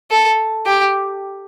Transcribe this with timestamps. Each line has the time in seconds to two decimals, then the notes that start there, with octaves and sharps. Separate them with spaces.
0.11 A4
0.66 G4